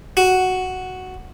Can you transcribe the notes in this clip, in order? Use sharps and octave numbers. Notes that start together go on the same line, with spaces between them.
F#4